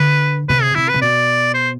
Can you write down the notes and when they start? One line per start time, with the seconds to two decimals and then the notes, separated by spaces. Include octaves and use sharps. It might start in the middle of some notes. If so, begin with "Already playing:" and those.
Already playing: D3 B4
0.49 C3 B4
0.62 G#4
0.75 C3 E4
0.89 B4
0.94 C3
1.02 B2 D5
1.54 C5